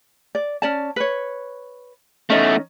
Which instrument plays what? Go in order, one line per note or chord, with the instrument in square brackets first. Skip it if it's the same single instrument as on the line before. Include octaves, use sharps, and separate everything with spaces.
[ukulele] D5
C#4 D5 A5
B4 C#5
[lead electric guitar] E2 A3 [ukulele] C#4 D#4 D#5